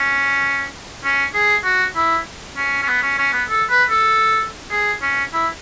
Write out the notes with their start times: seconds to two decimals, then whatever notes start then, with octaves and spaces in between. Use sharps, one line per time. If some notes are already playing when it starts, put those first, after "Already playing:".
Already playing: C#4
1.04 C#4
1.35 G#4
1.64 F#4
1.96 E4
2.57 C#4
2.83 C#4
2.88 B3
3.03 C#4
3.19 C#4
3.33 B3
3.49 A4
3.70 B4
3.90 A4
4.71 G#4
5.02 C#4
5.33 E4